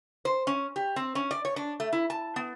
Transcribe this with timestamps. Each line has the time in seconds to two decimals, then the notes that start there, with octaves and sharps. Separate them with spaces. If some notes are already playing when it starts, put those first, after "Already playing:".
0.25 C5
0.47 C#4
0.76 G4
0.96 C4
1.15 C#4
1.31 D5
1.45 C#5
1.56 D4
1.80 A3
1.93 E4
2.10 A5
2.36 B3